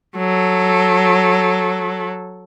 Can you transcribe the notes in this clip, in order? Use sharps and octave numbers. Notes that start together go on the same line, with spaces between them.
F#3 A4